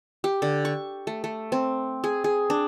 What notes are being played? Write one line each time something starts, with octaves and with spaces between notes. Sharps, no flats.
G4
D3
C#6
A3
A3
C4
G#4
G#4
D4